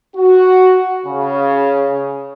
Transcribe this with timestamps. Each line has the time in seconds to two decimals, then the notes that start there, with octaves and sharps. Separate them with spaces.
0.16 F#4
1.05 C#3